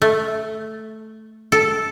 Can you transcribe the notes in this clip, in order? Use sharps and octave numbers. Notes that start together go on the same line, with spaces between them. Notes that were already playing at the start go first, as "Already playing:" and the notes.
A3
A4